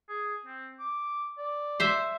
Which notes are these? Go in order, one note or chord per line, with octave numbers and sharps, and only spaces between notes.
G#4
C4
D6
D5
C5 E5